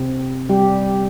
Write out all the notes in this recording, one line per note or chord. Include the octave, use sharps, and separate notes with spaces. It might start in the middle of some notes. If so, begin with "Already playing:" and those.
Already playing: C3 C4
G3 G4